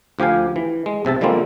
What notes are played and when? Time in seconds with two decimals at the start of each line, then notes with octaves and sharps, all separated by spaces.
0.19 D2 F3 G4 F5 G#5
0.56 E3
0.86 G#3
1.05 B1 C3 E5 A5
1.21 D3 F3 G3 G#3 A#3 C4